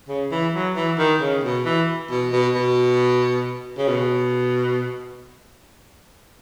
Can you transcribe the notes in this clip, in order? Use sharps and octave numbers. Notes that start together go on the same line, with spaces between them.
C#3
E3
F#3
E3
D#3
C#3
B2
E3
B2
B2
B2
C#3
B2